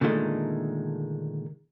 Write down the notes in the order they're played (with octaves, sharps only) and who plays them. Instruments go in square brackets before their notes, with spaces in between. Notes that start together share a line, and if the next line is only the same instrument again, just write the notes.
[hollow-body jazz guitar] A#2 D3 D#3 G#3 A3